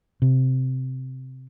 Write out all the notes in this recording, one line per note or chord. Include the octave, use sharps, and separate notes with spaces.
C3